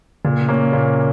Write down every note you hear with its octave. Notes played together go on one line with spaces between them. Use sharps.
A#2 C#3
A#3 C#4
A#2